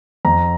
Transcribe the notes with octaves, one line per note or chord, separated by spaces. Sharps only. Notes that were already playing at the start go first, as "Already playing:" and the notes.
F2 A#5